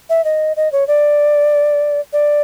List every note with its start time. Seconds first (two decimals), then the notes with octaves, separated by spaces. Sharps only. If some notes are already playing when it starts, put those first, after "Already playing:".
0.09 E5
0.24 D#5
0.57 D#5
0.72 C#5
0.87 D5
2.13 D5